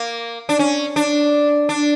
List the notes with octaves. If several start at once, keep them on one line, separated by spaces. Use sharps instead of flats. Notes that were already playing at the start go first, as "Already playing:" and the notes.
Already playing: A#3
D4
C#4
D4
D4